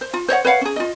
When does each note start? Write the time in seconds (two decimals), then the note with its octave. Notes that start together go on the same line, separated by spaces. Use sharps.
0.01 C5
0.14 F4
0.28 C5 C#5 D#5 F#5
0.45 B4 C#5 F5 F#5
0.61 C#4 G#4
0.76 F4 D#5